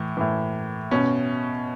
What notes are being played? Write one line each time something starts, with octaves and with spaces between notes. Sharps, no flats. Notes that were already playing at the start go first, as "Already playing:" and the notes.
Already playing: A2 E3
A2 E3
B2 C#4